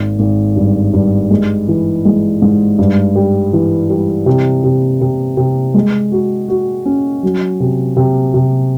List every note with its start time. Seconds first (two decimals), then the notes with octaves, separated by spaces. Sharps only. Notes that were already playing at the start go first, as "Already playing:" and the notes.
Already playing: G#1
0.19 G#1
0.56 G2
0.93 G2
1.30 G#3
1.68 E3
2.05 G#3
2.42 G#2
2.79 G2
3.15 G3
3.53 E3
3.90 G3
4.26 C3
4.64 C3
5.01 C3
5.37 C3
5.74 G#3
6.12 F#4
6.49 F#4
6.86 C#4
7.23 F#3
7.60 C3
7.97 C3
8.34 C3